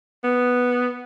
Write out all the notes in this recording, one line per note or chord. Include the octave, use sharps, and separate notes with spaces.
B3